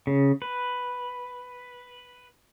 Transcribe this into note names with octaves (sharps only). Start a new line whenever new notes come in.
C#3
B4